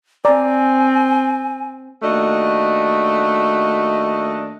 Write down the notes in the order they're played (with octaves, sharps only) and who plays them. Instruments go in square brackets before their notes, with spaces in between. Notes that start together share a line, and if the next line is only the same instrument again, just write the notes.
[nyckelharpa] C4 [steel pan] D5 A#5 [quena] G#5
[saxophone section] D#2 A3 D4 F#4 D#5